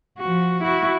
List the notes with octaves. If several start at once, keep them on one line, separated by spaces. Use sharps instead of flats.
F3 F#4
E4 F#4